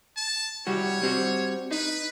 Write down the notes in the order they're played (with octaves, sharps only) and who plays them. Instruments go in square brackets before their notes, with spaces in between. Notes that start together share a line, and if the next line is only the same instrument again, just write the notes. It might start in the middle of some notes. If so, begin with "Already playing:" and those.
[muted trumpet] A5
[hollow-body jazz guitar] C2 G3 F#4 [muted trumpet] C#5
[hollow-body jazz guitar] G3 C4 F#4
[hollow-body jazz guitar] D#4 [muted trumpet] B4